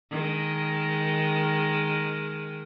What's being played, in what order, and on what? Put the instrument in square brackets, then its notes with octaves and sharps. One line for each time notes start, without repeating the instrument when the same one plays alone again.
[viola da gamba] D#3 G#3